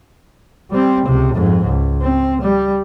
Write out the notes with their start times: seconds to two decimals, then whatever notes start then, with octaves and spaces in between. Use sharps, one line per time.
0.71 G3 C4
1.06 C#2 C3
1.35 F2 G#2
1.65 C#2
2.01 C4
2.42 G3